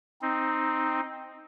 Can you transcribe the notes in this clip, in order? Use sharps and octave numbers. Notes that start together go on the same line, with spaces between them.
C4 D#4